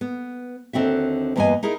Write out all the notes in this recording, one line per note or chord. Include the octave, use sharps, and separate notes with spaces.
B3
D#2 D3 C4 F#4 E5
E2 G2 A#3 B3 D#5 G#5
D#4 E4 G#4 A#4